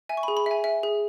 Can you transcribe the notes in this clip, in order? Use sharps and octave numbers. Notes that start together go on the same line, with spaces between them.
E5 G#5
C#6
B5
G#4
B5
E5 G#5
E5
G#4